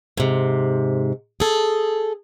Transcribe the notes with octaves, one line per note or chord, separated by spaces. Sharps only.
G#2 C3
G#4 A4